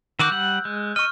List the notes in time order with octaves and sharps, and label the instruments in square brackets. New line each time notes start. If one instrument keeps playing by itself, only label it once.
[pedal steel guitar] D#3 F#4 D6 [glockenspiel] E6 F#6 G6
[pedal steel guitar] G3 F#5
G#3
[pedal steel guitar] D#5 [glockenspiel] C#6 F6